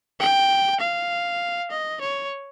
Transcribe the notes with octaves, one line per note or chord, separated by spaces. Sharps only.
G5
F5
D#5
C#5